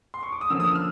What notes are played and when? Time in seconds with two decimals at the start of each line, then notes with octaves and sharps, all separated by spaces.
0.14 C6
0.23 C#6
0.32 D6
0.41 D#6
0.50 D3 F3 A#3 C#4 E6
0.60 D#6
0.68 E6
0.75 F6